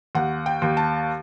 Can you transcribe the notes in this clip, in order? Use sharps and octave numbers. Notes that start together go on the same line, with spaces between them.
D#2 F#5
G5
D#2
A5